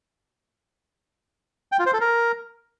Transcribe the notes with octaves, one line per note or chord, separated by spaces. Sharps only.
G5
F4
C5
A4
A#4